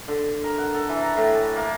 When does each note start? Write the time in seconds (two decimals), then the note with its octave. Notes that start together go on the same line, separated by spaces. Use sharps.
0.08 D3
0.44 A#4
0.58 F#5
0.75 A4
0.89 E3
1.02 A#5
1.17 A2
1.34 A5
1.56 A#3